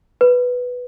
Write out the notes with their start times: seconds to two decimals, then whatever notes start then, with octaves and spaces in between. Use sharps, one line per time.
0.21 B4